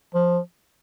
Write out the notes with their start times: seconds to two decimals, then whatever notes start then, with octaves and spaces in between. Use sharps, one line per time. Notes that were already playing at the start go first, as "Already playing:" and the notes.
0.14 F3